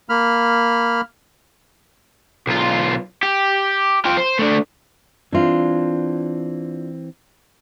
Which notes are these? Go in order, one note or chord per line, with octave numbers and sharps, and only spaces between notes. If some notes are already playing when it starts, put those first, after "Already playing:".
A#3 B5 F6
B1 F4
G4
F4 G5
C5
A3 D4
E3 C4 D4 F4